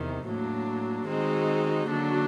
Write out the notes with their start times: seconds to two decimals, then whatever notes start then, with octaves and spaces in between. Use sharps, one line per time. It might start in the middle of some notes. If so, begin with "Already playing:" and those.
Already playing: E2 C3 D#3
0.27 A2 F#3 A#3 D4
1.08 D#3 G#3 C4 D#4 F#4
1.89 D3 F#3 A#3 D4 F#4